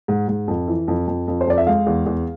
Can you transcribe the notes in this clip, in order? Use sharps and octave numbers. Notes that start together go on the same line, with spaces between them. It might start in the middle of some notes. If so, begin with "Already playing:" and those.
G#2
G#2
F2
E3
F2
F2
F2
C5
F2 D5
E5
G#3 F5
E2
E2